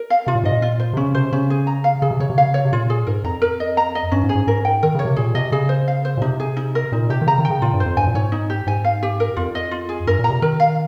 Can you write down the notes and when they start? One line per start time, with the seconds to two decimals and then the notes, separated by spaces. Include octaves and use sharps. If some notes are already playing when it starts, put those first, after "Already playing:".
Already playing: A#4
0.10 F5
0.27 C3 F4
0.35 A#2
0.44 G#2 D#5
0.51 A#2
0.62 F4
0.80 C5
0.93 C3
0.97 C#3 C#4
1.15 C3 C5
1.32 C#3 C#4
1.50 G#4
1.67 A#5
1.84 F5
2.02 C#3 G#4
2.11 C3
2.20 C#3 C#5
2.30 C3
2.37 C#3 F5
2.54 C#5
2.65 C3
2.72 A#2 F4
2.90 G#4
3.07 G#2 A#4
3.24 F2 A#5
3.42 A#4
3.60 D#5
3.77 A#5
3.95 D#5
4.12 G2 C#4
4.24 G#2
4.29 G#4
4.35 G#2
4.47 G#2 A#4
4.65 G5
4.83 D#3 A#4
4.95 C#3 C#5
5.05 C3
5.17 A#2 G#4
5.35 C3 D#5
5.52 C#3 G#4
5.69 C5
5.88 F5
6.05 C5
6.17 A#2
6.22 C3 D#4
6.40 G#4
6.57 D#4
6.75 A#4
6.92 A#2 D#4
7.09 C3 G4
7.22 D#3
7.27 C#3 A#5
7.39 D#3
7.45 G5
7.50 C#3
7.62 A#2 F4
7.74 G2
7.80 C5
7.85 F2
7.97 G2 G#5
8.07 A#2
8.15 G#2 C#5
8.32 D#4
8.50 G4
8.67 G#2 G#5
8.85 F5
9.03 G4
9.20 A#4
9.37 F2 F4
9.55 D#5
9.71 F4
9.89 G#4
10.07 G2 A#4
10.19 A#2
10.24 A#5
10.30 C3
10.42 D#3 A#4
10.60 F5